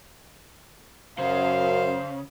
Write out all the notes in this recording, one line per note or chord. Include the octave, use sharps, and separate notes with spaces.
F#2 C#3 C5 F5